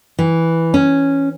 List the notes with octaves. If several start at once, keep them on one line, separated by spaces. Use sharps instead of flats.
E3
C#4